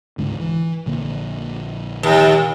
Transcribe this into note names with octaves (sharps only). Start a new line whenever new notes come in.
C#2 G#2 D3
E3
A#1 D3 A#3
D#2